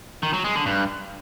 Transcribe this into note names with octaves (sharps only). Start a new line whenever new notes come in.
D#3
F#3
G#3
D3
G2